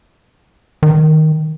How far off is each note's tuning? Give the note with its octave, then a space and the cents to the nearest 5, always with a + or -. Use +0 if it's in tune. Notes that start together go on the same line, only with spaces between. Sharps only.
D#3 +5